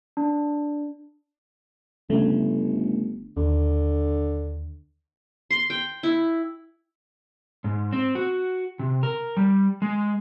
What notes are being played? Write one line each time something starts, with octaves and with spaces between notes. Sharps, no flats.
D4
G1 C#3 A3
D#2 D3
C6
G5
E4
G#2
C4
F#4
C3
A#4
G3
G#3